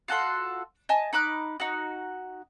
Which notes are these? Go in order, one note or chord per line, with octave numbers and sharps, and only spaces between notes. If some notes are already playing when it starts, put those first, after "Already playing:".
F4 F#4 A4 C6
D#5 G#5 A5
D#4 B5 D6 F#6
D#4 F#4